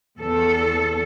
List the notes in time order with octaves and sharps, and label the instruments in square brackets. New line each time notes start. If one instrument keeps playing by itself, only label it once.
[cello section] E2 A4